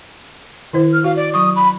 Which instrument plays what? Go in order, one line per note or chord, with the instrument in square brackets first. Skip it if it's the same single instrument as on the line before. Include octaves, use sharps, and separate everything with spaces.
[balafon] D#3 E4 C5
[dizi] F6
[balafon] F#4 [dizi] F5
[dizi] D5
[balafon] F#3 C#6 [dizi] D#6
[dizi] B5